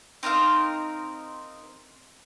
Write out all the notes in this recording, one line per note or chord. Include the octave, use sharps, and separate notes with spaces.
C4 D#4 A#4 F5